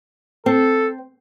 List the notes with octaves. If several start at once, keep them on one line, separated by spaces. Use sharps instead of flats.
C4 A4